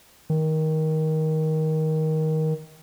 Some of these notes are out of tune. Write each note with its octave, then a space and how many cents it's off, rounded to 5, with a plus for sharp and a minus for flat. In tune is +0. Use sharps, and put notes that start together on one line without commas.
D#3 +15